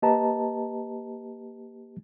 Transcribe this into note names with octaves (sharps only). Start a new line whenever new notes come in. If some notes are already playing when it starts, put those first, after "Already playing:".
A#3 G4 B4 D#5 A5 A#5